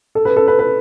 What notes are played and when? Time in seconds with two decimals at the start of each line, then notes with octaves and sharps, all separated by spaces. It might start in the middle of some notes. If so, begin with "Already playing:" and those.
0.15 A4
0.25 B4
0.37 A4
0.48 B4
0.59 B4